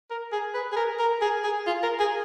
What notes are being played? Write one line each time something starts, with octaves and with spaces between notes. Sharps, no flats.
A#4
G#4
B4
G#4
A#4
A#4
G#4
G#4
F4
A#4
G#4